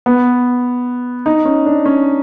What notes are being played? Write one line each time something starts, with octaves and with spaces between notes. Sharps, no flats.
B3
D#4
C#4
D4
C#4